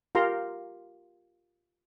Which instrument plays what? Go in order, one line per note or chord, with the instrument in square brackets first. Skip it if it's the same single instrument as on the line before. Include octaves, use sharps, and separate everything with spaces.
[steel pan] F4 G4 A#4 A#5 C6